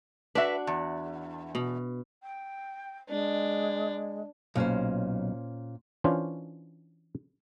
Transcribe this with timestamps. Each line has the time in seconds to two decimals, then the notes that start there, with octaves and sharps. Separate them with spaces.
0.35 D4 F#4 B4 E5
0.67 E2
1.55 B2
2.23 G5
3.09 G#3 D4
4.55 B1 A#2 C#4 C5
6.04 E3 C#4 D4 F4 C5 C#5